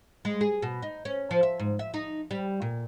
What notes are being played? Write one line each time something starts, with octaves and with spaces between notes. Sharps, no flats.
G#3
G#4
B2
D#4
C#4
F3
E5
G#2
E5
D#4
G3
A#2